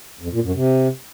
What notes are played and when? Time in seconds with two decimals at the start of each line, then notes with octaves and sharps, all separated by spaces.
0.21 F2
0.32 A#2
0.43 F#2
0.54 C3